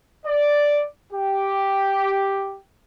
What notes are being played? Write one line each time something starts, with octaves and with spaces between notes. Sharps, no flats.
D5
G4